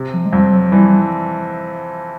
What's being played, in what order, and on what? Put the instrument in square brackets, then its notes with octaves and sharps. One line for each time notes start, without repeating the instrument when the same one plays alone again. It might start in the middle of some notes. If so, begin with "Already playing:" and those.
Already playing: [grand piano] C3
[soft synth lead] F3
G#3
[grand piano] F2 [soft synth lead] G3
[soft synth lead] F#3
[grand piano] E3 [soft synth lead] G3